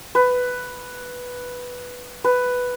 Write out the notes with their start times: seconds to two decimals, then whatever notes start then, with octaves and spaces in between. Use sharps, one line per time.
0.15 B4
2.24 B4